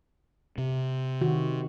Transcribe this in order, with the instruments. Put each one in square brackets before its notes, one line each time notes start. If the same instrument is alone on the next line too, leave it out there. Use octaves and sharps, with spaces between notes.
[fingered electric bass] C3
[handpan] D#3 F#4